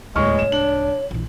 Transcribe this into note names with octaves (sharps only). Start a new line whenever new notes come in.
D1 D#2 G#3 C#5 C#6 F6
C2 G#2 E7
D4 F#7
A#1 E3